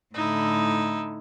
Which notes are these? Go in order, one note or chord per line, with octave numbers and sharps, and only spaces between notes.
A2 D3 D#4 E4